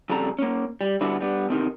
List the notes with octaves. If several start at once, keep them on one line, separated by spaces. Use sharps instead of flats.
F2 C#3 G3 A4 A#5
A#3 C#4
G3
D3 G3 B3 D4 E4 F#4
G3 B3 D4
E2 C3 D#3